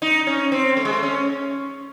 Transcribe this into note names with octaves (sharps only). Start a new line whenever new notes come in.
D#4
C#4
C4
A3
G#3
A3
C#4